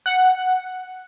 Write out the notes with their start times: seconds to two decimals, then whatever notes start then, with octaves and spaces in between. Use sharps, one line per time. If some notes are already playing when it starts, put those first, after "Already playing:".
0.06 F#5